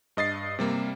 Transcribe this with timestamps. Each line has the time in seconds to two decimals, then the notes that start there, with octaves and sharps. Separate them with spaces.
0.17 G2 D#5 A6 C7
0.59 C3 G3 A#3